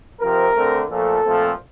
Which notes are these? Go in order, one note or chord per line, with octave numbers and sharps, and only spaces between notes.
C3 F3 C4 A#4
D3 A3 C4
A#2 F3 A3 A4
A#2 F3 A3 C4